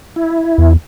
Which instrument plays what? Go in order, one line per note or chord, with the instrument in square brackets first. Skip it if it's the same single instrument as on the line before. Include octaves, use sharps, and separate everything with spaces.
[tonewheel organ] E4
[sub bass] E2